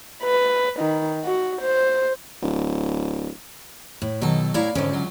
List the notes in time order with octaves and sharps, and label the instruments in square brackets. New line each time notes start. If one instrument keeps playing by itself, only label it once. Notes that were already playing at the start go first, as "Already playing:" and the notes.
[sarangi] B4
D#3
F#4
C5
[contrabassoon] D1
[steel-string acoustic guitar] A2
[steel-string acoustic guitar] B2 D#3 [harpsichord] F#3 A4
[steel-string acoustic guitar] A2 E4 A#5 [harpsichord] C#5 D5 F5
[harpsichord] F2 G#2 D#3 [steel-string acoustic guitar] D3 C#4
[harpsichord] C#2 F#3